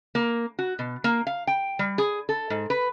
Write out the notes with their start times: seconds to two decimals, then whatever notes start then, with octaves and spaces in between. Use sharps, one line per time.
0.15 A#3
0.59 F#4
0.79 B2
1.04 A#3
1.27 F5
1.47 G5
1.79 G3
1.98 G#4
2.29 A4
2.50 G#2
2.70 B4